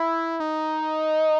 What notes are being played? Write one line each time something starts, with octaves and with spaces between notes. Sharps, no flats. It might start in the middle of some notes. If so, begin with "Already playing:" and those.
Already playing: E4
D#4